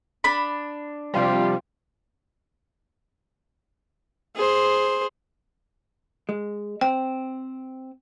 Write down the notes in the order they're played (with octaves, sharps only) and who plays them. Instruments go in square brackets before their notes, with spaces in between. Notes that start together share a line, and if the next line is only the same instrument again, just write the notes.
[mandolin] D4 B5
[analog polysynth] C3 F3 G3 [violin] F4 G4
[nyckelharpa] G#4 C5
[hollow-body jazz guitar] G#3
[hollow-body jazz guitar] C4 [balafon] G5